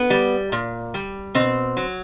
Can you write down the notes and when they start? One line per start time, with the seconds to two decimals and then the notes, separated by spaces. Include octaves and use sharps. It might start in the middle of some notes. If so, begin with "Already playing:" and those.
Already playing: B3
0.10 G3
0.52 A#2
0.94 G3
1.35 B2 C4
1.77 F#3